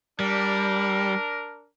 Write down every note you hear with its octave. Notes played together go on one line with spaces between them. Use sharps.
G3 D4 A#4